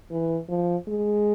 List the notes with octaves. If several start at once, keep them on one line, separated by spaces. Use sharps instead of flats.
E3
F3
G#3